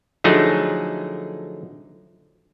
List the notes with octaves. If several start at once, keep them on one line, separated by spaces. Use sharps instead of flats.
D3 F3 F#3 A3 D#4 G#4